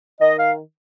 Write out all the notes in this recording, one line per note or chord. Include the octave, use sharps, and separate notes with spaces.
D#3 D#5
F5